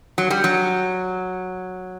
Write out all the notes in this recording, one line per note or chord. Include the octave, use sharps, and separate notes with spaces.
F#3
G3
F#3